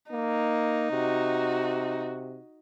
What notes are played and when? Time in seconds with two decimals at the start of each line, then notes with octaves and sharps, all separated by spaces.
0.12 A#3 D#4
0.91 C3 F#4